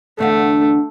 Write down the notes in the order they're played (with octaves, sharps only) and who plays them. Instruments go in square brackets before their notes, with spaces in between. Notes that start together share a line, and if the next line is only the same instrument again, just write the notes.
[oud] E2 D3 F5 [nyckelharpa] A3